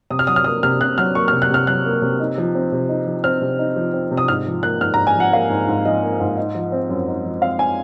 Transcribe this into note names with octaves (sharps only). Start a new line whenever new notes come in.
C3 D#6
F6
F#3 D#6
F6
A#3 D#6
C3 F6
C3 F#6
F#3 F6
A#3 C#6
F6
C3
F#6
C3 F6
F#3 F#6
A#3
C3
D#4
F3
C4
C3
D#4
F3
C4 F6
C3
D#4
F3
C4
C3
D#6
G#2 F6
F3
A#3 F#6
G#2 F6
A#5
G#2
G#5
F3 F#5
A#3 F5
G#2
G#2
F3 D#5
A#3
G#2
D#4
F3
C4
F#2
D#4
F3
C4 F5
G#5